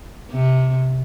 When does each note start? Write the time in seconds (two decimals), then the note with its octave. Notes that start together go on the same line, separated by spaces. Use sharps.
0.30 C3